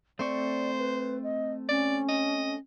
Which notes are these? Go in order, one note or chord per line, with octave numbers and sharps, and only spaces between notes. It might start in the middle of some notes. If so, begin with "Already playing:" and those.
A3 C4 C5 D5 C#6
B4
D#5
C#4 D5
D#5